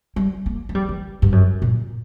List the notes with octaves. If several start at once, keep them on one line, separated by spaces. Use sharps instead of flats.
G3
A#3
A#3
G3
E3
G2
F#2
A#2